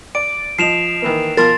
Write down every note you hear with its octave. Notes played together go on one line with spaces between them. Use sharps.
D5 D7
F3 D#5 C7 E7 F7
D#3 E3 A#3
B2 F3 A#4 F5 C6 A6